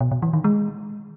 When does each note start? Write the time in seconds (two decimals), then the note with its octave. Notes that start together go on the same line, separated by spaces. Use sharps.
0.01 B2
0.12 B2
0.22 E3
0.33 D#3
0.44 G#3